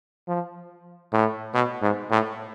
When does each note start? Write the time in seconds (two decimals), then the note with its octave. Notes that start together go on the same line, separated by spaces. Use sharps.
0.28 F3
1.13 A2
1.54 B2
1.82 G#2
2.11 A2